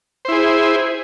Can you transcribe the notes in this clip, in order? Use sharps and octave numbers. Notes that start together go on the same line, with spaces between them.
E4 G#4 C5